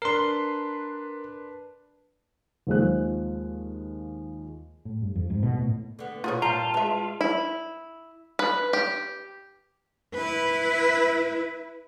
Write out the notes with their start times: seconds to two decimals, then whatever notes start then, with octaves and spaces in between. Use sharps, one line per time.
0.02 D4 A#4 B4 C6 C7
2.67 D#2 F3 G#3 F#6
4.85 A2
5.02 G2
5.16 F2
5.30 G#2
5.43 B2
5.58 A2
5.99 D3 B3
6.24 B2 A#3 F4 G#4 C#5
6.42 G2 A#2 G3 F4 A5 A#5
6.74 G#3 B4 E5
7.21 E4
8.39 B4
8.73 G4
10.14 E4 B4